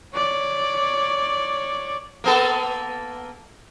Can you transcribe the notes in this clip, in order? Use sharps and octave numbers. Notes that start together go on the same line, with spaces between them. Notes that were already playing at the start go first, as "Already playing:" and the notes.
C#5 D5
A#3 B3 A4